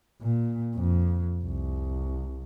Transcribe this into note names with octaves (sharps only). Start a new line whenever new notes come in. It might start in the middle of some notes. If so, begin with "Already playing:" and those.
A#2
F2
C2